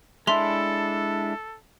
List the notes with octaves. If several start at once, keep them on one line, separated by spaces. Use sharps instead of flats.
G#3 D4 E4 A4 E5 C6 F7